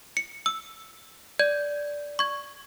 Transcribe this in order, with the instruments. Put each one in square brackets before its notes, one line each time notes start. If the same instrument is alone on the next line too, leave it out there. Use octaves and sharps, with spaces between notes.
[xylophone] C#7
E6
[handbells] D5 [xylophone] G#6
[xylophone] C#6 G#6